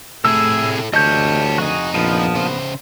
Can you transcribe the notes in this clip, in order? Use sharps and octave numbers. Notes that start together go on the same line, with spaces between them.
C3 A3 E4 G#4 A4 E6
D2 F4 G4 C#5 D#5 A5 G6
F2 D#4 F#4 G#4
A#1 F3 B3
C#3 C5